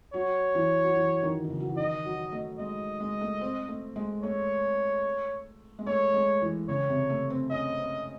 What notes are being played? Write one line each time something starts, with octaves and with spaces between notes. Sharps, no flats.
F#3 C#5
E3
F#3
E3
D#3
D#3
C#3
F#3
E3
D#3 D#5
F#3
A3
G#3 D#5
G#3
A3
C4
A3
G#3
A3 C#5
G#3
A3 C#5
G#3
E3
C#3 C#5
C3
A3
C4
C#4 D#5
C4